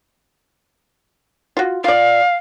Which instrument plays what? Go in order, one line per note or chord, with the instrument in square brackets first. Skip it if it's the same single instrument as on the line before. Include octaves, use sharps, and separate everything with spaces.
[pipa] F4 F#4
[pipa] F4 D5 [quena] F5